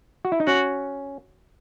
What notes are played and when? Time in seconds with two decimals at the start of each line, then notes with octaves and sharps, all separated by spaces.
0.25 F#4
0.32 E4
0.40 D#4
0.47 C#4 F#4